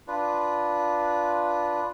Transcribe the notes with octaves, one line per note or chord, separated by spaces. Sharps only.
D4 F4 B4